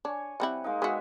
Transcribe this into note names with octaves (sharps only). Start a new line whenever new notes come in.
D4 C#5 G#5
G3 C4 E4 F#5
G#3 A#3 D#4
G#3 B3 F#4 E5